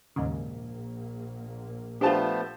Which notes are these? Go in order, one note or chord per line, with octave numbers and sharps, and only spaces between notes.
A#1 D#2 G#2 C#3 A#3
F3 A3 B3 D4 F4 G4 C5 A5